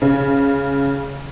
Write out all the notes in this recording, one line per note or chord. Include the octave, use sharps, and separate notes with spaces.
C#3